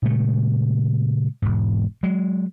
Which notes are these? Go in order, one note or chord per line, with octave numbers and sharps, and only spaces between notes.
A#2 C#3 G#3 A3
E1 G#2
F#3 G#3